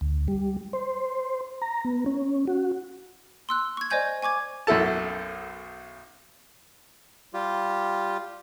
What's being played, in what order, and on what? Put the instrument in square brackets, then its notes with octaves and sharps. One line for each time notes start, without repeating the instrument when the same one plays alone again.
[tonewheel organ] D2
G3
C5
A#5
B3
C#4
F#4
[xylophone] C6 E6 F#6
C#6 G#6
C5 D5 D#5 G#5 G6 G#6
G#5 C#6 D6 G#6
[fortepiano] B1 F#2 E4 A4 A5
[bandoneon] G3 F4 G4